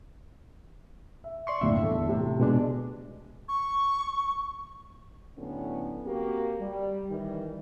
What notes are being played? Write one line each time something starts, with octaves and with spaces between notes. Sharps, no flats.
E5
D5 C6 C#6
G1 D#2 A2 E5
E2 A4
A2 C3 A3
B2 G#3 D4
C#6
A2 D3 F#3 B3 C#4
A#3 C4 F#4 G4
G3
D#3 E3 G3